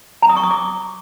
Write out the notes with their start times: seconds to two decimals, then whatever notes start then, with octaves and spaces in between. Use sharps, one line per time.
0.22 A#5
0.29 D#6
0.36 C#6
0.43 D#6
0.50 D6